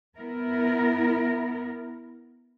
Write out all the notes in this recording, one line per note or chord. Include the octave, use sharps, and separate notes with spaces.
B3 E4 A#4